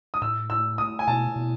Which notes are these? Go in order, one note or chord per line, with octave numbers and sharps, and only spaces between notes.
D#6
A2 E6
E6
D#6
G#5
B2 A5
B2